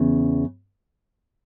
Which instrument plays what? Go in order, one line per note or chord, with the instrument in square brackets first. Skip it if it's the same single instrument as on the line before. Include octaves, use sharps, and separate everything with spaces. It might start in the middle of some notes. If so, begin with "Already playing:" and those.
Already playing: [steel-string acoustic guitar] E2 C#3